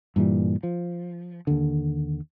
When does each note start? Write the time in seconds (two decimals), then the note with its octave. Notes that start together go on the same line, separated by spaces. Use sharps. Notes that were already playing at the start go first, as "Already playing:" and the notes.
0.16 G2 A#2 E3 G3
0.63 F3
1.47 D#2 D3